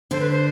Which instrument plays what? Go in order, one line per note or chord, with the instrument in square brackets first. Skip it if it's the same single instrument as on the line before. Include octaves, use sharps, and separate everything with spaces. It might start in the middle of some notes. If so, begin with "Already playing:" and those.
[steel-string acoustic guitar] D3 D4 [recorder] C5
[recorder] B4
C5